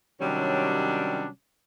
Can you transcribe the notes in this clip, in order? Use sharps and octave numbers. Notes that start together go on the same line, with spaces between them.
C3 D#3 F#3 G3 C#4 D4